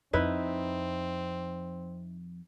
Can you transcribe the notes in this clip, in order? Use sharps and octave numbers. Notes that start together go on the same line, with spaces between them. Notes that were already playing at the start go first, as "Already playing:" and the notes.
F2 C4 D#4 E4 B4